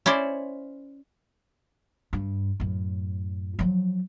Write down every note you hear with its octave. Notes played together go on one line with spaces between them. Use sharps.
C#4 E4 C5 D5
G2
F#2 A2
F3 F#3